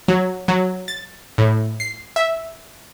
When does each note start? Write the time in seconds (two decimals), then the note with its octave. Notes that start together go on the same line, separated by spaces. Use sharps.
0.08 F#3
0.48 F#3
0.88 A6
1.38 A2
1.80 C7
2.16 E5